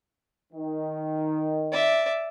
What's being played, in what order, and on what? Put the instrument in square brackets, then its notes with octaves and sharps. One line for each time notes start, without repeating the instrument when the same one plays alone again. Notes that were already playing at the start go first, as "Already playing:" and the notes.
[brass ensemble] D#3
[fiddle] D5 E5